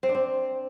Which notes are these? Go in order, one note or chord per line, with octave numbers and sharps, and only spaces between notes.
C4
D4
C4